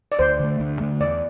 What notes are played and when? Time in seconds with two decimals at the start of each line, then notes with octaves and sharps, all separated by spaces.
0.12 D5
0.19 D2 C5
0.40 D3 A3
0.60 D2
0.80 D3 A3
1.00 E2 D5